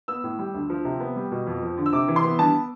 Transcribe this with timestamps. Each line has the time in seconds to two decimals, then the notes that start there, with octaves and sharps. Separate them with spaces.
0.08 B3 E6
0.24 A2
0.39 G3
0.54 D2
0.70 F3
0.85 C3
1.00 B3
1.16 G3
1.32 B2
1.47 F2
1.62 F3
1.77 D3
1.86 E6
1.93 C3 D6
2.08 E3
2.16 C6
2.24 B3
2.39 G2 A5